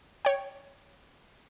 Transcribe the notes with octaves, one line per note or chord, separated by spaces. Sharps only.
C#5 G5